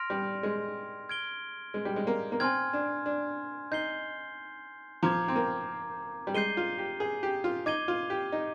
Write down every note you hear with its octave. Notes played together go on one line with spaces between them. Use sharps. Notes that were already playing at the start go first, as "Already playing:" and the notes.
Already playing: C6 F6 A#6 D7 F7
G3
G#3
F6 G#6 D7 G7
G#3
G3
G#3
A#3
A#3
C4 G#5 C6 F6 G#6
D4
D4
D#4 G6 C7 G7
F3 A#5 D6 G#6
C4
A#3
G3
G#3 G6 C7 D#7 G7
F4
G4
G#4
G4
F4
D#4 D6 G#6 D#7 G7
F4
G4
D#4